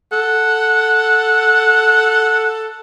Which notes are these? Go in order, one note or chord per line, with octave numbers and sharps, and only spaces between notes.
A4 F#5